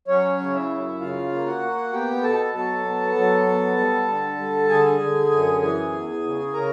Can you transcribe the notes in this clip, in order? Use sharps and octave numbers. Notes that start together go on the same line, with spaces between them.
F#3 C#4 C#5
C#3
E4 E5
F#2
C#3 F4 F5
A#3
F#4 F#5
A#3
B3 G4 G5
B2 A4 A5
F#3 A4 A5
B3
F#3
B3
G3
D3
G3
D3 G#4 G#5
D3
F#2
E3 G#4 G#5
E2
C#3
C#3 A#4 A#5